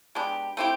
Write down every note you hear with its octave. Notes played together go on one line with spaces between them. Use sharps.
G#3 B3 D4 G4
A3 C4 E4 G4